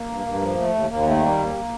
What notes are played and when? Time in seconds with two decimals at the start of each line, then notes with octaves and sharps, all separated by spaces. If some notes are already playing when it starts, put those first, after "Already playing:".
Already playing: A#3
0.09 G2
0.26 G2
0.42 F3
0.58 A3
0.74 D#2
0.90 D#2 A#3
1.06 D#3 A3
1.16 A3
1.22 G3 A#3
1.38 D#2